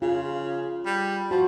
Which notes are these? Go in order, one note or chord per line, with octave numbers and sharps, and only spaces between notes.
C#3 F4
G3
F3 F#4